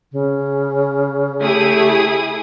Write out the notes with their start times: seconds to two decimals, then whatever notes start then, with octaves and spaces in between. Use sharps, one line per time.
0.12 C#3
1.40 A3 E4 G4 G#4 D#6